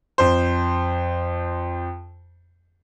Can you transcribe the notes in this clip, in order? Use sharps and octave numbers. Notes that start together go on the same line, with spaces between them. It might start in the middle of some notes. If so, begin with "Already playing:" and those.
F2 C5